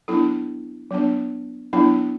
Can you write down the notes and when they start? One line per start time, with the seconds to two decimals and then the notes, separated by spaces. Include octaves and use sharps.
0.08 F#3 B3 D4 E4 A4
0.91 F#3 B3 D4
1.73 F#3 B3 D4 E4